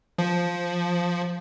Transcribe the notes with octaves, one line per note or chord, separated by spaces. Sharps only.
F3